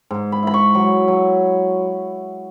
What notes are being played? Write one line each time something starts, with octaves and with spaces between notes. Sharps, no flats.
G#2
B5
E4 B5
C#6
F#3
F#3